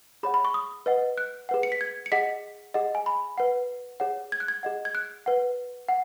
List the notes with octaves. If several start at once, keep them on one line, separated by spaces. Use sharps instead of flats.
G#4 C#5 F#5 B5
B5
C#6
D#6
B4 D#5 F#5
F#6
G#4 B4 F#5
C#7
B6
G#6
C#7
G#4 D#5 F#5 B6
G#4 D#5 F#5
G#5
B5
B4 F#5
G#4 C#5 F#5
G#6
F#6
G#6
G#4 D#5 F#5
G#6
F#6
B4 F#5
F#5